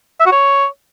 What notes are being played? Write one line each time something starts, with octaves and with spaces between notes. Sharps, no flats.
E5
F#4
C#5